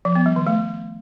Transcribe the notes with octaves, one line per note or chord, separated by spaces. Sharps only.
F3
B3
G3
D#3
A3